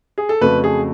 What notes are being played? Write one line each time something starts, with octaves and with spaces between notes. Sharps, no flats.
G#4
A4
F2 C#3 F#3 A3 B4
G#4